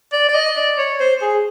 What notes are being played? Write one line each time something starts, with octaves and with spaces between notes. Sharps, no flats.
D5
D5
D#5
D5
C#5
C5
G#4